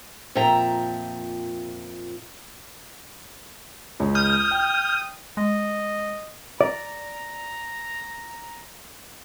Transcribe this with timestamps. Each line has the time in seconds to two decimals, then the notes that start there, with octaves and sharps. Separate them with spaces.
0.35 F2 A#2 E5 G5 A#5
4.00 C#2 G#3 C#5
4.15 D#6 F6 G6
4.51 G5
5.37 G#3 D#5
6.61 D5 A#5